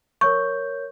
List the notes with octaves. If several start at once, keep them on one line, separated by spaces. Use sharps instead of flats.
A#4 C#5 C#6 G6